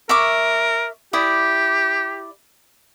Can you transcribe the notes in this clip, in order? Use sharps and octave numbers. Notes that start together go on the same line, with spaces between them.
A#4 E5 C#6 D6
E4 G4 D5 D#6